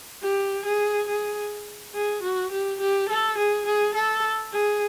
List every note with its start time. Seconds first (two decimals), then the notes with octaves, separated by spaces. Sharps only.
0.22 G4
0.65 G#4
1.08 G#4
1.94 G#4
2.23 F#4
2.52 G4
2.80 G4
3.09 A4
3.38 G#4
3.66 G#4
3.94 A4
4.53 G#4